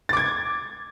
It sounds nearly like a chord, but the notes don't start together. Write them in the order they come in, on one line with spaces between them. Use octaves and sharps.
A6 D6 G#6